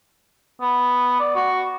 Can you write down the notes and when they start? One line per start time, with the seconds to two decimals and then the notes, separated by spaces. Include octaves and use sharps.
0.61 B3
1.20 D5
1.36 F#4